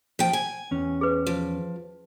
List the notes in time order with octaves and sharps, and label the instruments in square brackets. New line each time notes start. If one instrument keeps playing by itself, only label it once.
[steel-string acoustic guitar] F3 G5
G#5
[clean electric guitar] E2 C#4
[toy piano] G#4 B4
[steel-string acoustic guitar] F3